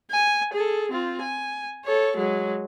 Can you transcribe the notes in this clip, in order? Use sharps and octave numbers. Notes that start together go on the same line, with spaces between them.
G#5
G#4 A4
C4 F4
G#5
A4 C#5
F#3 G#3